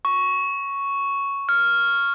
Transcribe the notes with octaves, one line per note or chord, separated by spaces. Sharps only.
C#6
F6